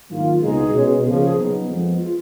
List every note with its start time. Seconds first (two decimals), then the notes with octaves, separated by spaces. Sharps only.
0.10 G#2 D#3 F#3 A#3 F4
0.41 C#2 B2 G#3 D#4 G#4
0.72 B2 G#3 C#4
1.04 C#2 C#3 F3 A#3 C#4 G#4
1.20 G#4
1.35 B2 F#3 B3 D#4
1.66 F2 F3 G#3 B3
1.98 F4